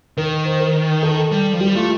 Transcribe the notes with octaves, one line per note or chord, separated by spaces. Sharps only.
D#3 A#4
C5
A#4
A4
G3
F3
G3 G4
A3 F4